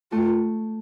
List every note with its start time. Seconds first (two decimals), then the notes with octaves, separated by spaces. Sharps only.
0.12 A3 F4